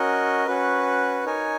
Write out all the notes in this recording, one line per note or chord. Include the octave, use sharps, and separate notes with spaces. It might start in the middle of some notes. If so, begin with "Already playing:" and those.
Already playing: C#4 F#4 A#4 D#5
C#4 F#4 B4
D#4 A#4 C#5 G#5